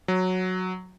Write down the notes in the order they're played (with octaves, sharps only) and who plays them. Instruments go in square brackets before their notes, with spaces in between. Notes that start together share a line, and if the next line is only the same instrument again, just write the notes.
[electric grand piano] F#3